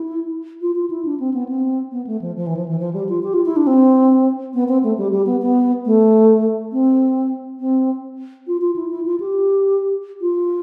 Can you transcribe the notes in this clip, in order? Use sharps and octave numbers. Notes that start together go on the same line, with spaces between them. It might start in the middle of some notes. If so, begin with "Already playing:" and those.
Already playing: E4
F4
F4
E4
D4
C4
B3
C4
B3
A3
F3
F3
E3
F3
E3
F3
G3
F4
G4
F4
E4
D4
C4
B3
C4
A3
G3
G3
B3
B3
A3
C4
C4
F4
F4
E4
E4
F4
G4
F4